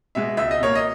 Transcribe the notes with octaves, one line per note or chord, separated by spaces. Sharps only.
B2 G#3 E5
C#2 E5
D#5
B2 A#3 C#5
D#5